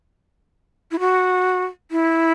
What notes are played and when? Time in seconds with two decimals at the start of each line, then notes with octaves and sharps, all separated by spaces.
0.91 E4
0.99 F#4
1.91 E4